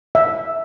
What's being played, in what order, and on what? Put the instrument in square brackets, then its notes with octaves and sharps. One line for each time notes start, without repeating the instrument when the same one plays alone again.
[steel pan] E5